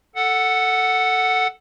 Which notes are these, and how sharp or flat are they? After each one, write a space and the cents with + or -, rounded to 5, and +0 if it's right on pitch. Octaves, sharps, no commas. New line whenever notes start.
A4 +0 F#5 +0